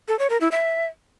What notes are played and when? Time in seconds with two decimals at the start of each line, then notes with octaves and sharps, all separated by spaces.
0.08 A4
0.19 C#5
0.30 A#4
0.41 E4
0.51 E5